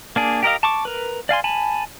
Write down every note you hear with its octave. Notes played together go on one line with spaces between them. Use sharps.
A#3 D4 G#4
G4 A#4 D#5 F5
A5 C#6 D6
A#4 B4
D5 F5 G#5 C6
G#5 A5 B5